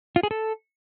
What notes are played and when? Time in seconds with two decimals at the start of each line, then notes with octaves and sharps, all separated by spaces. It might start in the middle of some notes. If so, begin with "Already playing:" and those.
0.16 F4
0.23 G#4
0.31 A4